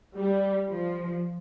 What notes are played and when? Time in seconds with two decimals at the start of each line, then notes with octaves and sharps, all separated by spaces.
0.15 G3
0.72 F3